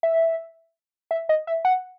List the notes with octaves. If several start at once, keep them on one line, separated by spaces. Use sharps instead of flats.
E5
E5
D#5
E5
F#5